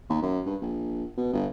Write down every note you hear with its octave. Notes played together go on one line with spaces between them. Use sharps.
D#2
F#2
G2
A#1
B2
G1